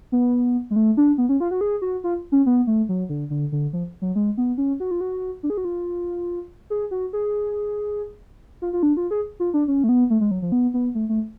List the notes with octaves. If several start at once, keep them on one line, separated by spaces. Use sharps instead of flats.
B3
G#3
A3
D4
B3
C#4
F4
F#4
G#4
F#4
F4
C#4
B3
A3
F#3
D3
D3
D3
F3
F#3
G#3
B3
C#4
F#4
F4
F#4
D4
G#4
F#4
F4
G#4
F#4
G#4
F4
F4
D4
F4
G#4
F4
D4
C#4
A3
B3
A3
G#3
F#3
F3
B3
B3
A3
A3